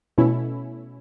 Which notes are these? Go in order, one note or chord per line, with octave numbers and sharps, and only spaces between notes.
B2 A3 C#4 E4